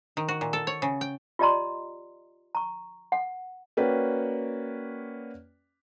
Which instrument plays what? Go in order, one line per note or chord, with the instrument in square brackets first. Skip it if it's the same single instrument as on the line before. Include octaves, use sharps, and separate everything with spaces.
[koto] D#3
F#4
A#2
A4
C#5
C#3
G5
[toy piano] F4 G4 D5 D#5 A#5 C6
A#5 C#6
F#5
[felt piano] A#3 C#4 F#4 B4 D5 G5